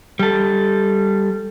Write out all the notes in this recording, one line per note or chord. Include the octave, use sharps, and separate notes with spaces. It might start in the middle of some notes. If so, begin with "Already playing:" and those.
G3 A4